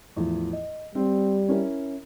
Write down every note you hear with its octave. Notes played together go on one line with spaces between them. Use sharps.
E2 A2 F3
D#5
G3 C4
C#4 E4 A#4